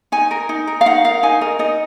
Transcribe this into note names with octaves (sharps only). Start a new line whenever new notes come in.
D#4 G#5
A#4
D#4
A#4
F5
D#4 F#5
A#4 F5
D#4 G#5
A#4 D#5
D#4 D#5